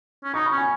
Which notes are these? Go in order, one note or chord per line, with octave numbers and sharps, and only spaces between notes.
C#4
D#4 C#6
B5
C#4
G#5